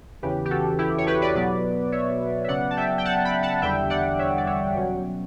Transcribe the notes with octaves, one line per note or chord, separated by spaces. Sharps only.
E2 C#3 E3 G4 B4
G4
F#4 A4
E4 G4
C#5
G4 B4
B4 D5
B2 F#3 B3 B4 D5
C#5 E5
E5
C#3 F#3 B3 D5 F#5
A5
E5 G5
G5
F#5 A5
G5 B5
F#5 A5
E2 D3 G3 E5 G5
D5 F#5
C#5 E5
D5
C#5 E5
B2 F#3 C#4